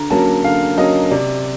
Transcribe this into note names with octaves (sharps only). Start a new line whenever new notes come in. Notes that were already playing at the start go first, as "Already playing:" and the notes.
Already playing: D3 A#5
F#3 A#3 C#4 A5
D3 F5
F#3 A#3 C#4 D#5
C3 D5